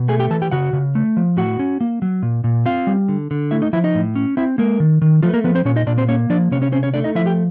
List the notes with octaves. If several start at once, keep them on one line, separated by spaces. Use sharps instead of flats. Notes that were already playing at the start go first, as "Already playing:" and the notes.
Already playing: B2
A3 G#4 G#5
G4 G5
E3 A4 A5
G4 G5
C#3 F#4 F#5
C#3
A3
F3
A2 F#4 F#5
C#4
A#3
F#3
A#2
A#2
C4 F4 F5
G3
D3
D3
A3 E4 E5
D#4 D#5
F3 E4 E5
D#4 D#5
A2
C#4
C4 E4 E5
G#3 A#3 A#4
D#3
D#3
F3 A3 F4
B4
A#3 A#4
F3 B3 B4
C4 C5
A#2 C#4 C#5
D#4 D#5
A#2 D4 D5
C4 C5
A#3 C#4 C#5
F3 D4 D5
C3 C#4 C#5
C#4 C#5
C4 C#4 C5
C#4 C#5
A3 D4 D5
D#4 D#5
F3 E4 E5
G4 G5